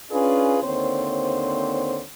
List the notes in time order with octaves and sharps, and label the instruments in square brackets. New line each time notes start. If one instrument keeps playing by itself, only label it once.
[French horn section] C#4 D4 F4 G#4 B4
D#2 D3 C4 C5 C#5